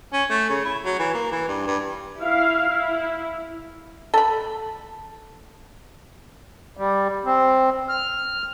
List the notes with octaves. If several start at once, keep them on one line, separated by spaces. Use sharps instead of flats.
C#4
A3
C#3
E4
F#3
E3
A#3
E3
G2
G2
E4 F5
E4
A4 B5
G3
C4
F6